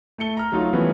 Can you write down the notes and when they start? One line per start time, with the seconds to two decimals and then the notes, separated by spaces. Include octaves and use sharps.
0.18 A3 A5 C#7 G7
0.37 A#5 F6
0.52 F#3 A3 D#4 F4 F#4
0.73 E3 F3 G3 A3 B3 C#4